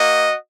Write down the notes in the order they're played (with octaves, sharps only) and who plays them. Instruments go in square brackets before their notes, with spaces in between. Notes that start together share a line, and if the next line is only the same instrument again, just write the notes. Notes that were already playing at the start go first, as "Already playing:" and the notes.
Already playing: [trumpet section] A#3 F#4 D#5